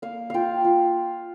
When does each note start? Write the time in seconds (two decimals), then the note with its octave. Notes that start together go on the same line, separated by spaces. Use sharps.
0.02 A#3 F5
0.30 F4 F5 G5
0.65 F4